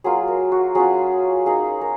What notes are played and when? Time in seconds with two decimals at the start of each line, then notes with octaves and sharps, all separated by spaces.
0.04 F#3 A#3 F4 G#4
0.28 A#4
0.52 F#4
0.75 F#3 C#4 F4 G#4
1.46 A#3 D#4 G#4
1.81 A#4